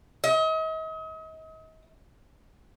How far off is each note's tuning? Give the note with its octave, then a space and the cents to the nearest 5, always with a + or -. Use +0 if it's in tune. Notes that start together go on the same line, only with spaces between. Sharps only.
D#5 +40